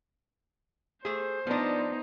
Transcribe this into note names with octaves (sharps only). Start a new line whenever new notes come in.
A3 G#4 C5
F3 B3 D4 D#4